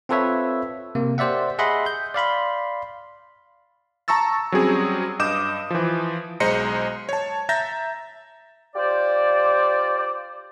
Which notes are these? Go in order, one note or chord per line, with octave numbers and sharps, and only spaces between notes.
C4 F4 A4 B4 C#5 E5
C3 A#3
G4 C5 D5 E5 F#5
G#4 D#5 E5 F#5 B5 C6
G6
D5 F5 B5 C6
A5 A#5 C#6 E6 A6
F#3 G3 C4 C#4 G#4
G2 D#5 D6 D#6 G6 E7
E3 F3
B1 G#3 C5 D#5 A#5 C#7
C#5 A5
E5 A#5 G6 A6 A#6
F4 G4 C5 D5